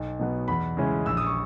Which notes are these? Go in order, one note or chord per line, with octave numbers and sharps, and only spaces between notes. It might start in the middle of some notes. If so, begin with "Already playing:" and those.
Already playing: B1
B2 F#3 B3
E2 B5
C#3 G#3 C#4 E4
A#1 E6
D#6
C#6